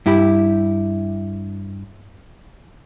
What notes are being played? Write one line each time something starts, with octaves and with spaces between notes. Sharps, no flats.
G2 E4 G4 B5